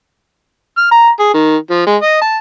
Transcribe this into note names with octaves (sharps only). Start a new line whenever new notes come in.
F6
A#5
G#4
D#3
F3
G#3
D#5
A5